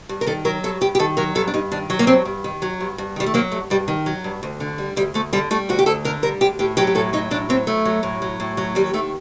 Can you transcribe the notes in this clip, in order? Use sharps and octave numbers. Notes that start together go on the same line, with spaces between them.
G2
A#4
D#3 A4
F#3 A#4
G2 A4
G2 G4
G4
D#3 A4
F#3 A#4
G2 A4
D4
G2 D#4
D#3 D4
F#3
A#3
G2 C4
G2
D#3
F#3
G2
G2
D#3 G3
A3
F#3 A#3
G2 A3
G2 G3
D#3
F#3
G2
D2
D3
G3
D2 G3
D2 A3
D3 G3
G3 A3
D2 F#4
G4
D2 A4
D3 A#4
G3 A#4
D2 G4
A2 G4
F#3 G4
G4
A2 A4
F#3 D#4
A2 D4
F#3 C4
A2 A3
F#3
A2
F#3
A2
F#3
D#2 G3
D#3 A3